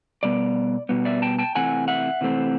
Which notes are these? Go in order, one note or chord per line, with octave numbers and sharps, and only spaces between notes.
B2 G3 B3 D5
B2 G3 B3
D5 E5
G5 A5
G5 A5
C3 E3 A3 C4 F#5 G#5
E5 F#5
C3 E3 A3 C4